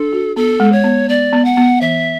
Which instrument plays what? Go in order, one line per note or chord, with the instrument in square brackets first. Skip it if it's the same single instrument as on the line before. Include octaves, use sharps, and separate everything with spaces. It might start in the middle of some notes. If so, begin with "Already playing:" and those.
Already playing: [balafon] D4 [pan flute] A4
[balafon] F#4
[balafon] B3 [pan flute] A4
[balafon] G#3
[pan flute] C#5
[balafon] B3
[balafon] B3 [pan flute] D5
[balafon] B3
[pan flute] F#5
[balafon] B3
[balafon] E3 [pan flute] E5